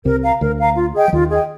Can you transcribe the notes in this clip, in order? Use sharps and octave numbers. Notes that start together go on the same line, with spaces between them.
C2 C3 A#4
F5 A#5
D2 D3 A#4
F5 A#5
F4
G#4 D#5 G5
F3
D#2 D#3 F4
G#4 D#5 G5